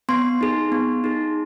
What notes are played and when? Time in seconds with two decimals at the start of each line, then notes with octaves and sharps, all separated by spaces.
0.09 B3 C6
0.41 D#4 G#4
0.72 B3
1.04 D#4 G#4